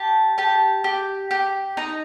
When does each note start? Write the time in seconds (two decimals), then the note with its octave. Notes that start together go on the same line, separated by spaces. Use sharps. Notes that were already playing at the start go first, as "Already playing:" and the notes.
Already playing: G4 A5
0.38 G4 A5
0.84 G4
1.31 G4
1.77 D#4 A#5